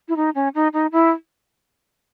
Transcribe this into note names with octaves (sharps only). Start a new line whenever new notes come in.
E4
D#4
C#4
D#4
D#4
E4